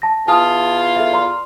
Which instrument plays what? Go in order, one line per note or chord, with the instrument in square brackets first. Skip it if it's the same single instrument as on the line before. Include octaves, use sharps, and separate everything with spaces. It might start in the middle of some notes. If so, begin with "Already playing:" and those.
[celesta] A5 A#6
[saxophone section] E2 F4 [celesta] G#5 A5 D#6
[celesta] A4 E5
D5 A#5 C6